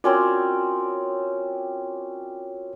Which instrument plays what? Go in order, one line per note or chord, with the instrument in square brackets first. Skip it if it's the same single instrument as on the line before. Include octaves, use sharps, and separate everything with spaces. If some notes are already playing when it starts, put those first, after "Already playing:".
[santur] C4 C#4 D5 [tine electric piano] F4 F#4 A#4